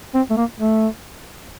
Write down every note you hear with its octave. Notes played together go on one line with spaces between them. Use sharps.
C4
A3
A#3
A3